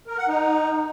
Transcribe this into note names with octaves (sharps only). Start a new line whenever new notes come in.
A#4
F#5
D#4